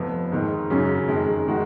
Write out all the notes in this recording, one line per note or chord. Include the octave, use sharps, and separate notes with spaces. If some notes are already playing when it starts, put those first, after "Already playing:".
Already playing: F1 F2 F3 B3
G#2 D#3 A#3 D#4
F#2 C#3 F#3 C#4
F2 D#3 G#3
D#3 G#3 D#4 F#4